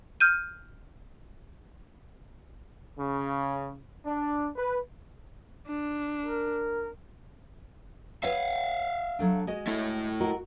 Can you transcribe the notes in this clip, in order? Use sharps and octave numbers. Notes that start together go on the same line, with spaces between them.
F6 G6 D#7
C#3
D4
B4
D4
A#4
B4 C#5 E5 F5
F#3 A3 D4
G#3 F#4 D#5
A3 E4
F#4 A#4 D#5